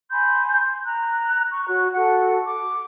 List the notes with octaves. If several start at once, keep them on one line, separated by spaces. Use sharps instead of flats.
G#5 B5 C6 G6
A#5 F#6
C#6
F#4 C#5 F#6
F#4 A4 F#5
D6